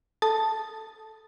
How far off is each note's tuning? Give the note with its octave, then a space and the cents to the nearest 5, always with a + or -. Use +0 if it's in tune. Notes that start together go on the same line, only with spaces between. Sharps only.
A4 +0 A5 +0 D#6 +0